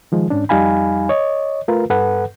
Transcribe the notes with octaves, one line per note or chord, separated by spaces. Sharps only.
D#3 F3 G#3
G#2 C#4 D4
F2 G3 D#4 F5 G#5 B5
C#5 D#5
A3 F4 A#4 B4
G2 A4 B4 F#5